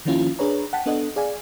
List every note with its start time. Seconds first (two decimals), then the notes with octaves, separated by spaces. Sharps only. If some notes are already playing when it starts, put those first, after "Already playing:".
0.05 D#3 F3 A#3 C#4 E4 F4
0.39 D4 G#4 B4 C#5 A#5
0.73 F#5 G5 A5 B6
0.86 B3 D4 A4 D#5 F#5
1.16 G#4 D5 F5 G#5